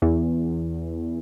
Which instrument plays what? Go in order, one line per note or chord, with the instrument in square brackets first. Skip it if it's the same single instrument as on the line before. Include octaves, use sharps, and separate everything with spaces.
[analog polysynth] E2